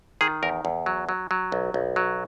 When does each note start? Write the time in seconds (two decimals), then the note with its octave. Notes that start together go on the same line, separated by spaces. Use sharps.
0.21 D#3 G#4
0.43 E2 A#4
0.65 E2
0.86 F#3
1.09 F#3
1.31 F#3
1.52 B1
1.74 B1
1.96 F#3